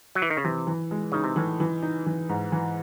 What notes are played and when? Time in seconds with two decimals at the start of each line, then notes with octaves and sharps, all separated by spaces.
0.15 F#3
0.22 E3
0.30 D#3
0.37 C#3
0.44 C3 E3
0.67 E3
0.91 G#3
1.12 C#3 D#4
1.24 C3
1.36 A2 E3
1.60 E3
1.82 D#4
2.06 E3
2.29 G#2
2.52 E3